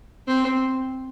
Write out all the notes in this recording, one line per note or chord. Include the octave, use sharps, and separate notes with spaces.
C4